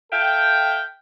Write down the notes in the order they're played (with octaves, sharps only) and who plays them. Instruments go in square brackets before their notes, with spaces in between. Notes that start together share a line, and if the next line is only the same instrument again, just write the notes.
[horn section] A4 E5 F5 G5